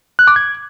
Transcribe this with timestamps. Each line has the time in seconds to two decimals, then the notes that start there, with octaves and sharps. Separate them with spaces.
0.19 F#6
0.27 D6
0.36 G#6